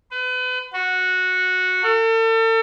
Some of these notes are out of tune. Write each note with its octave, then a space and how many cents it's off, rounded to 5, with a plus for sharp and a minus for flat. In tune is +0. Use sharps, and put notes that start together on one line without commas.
B4 +35
F#4 -10
A4 +40